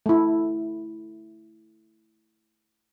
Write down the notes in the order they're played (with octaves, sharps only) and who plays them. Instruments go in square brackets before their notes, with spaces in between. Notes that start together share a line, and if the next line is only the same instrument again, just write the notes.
[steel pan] A3 E4